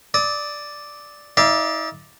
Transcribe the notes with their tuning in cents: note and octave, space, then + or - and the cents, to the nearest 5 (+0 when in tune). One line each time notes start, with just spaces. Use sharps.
D5 +0 D#6 +40
D#4 +40 D5 +0 F5 -45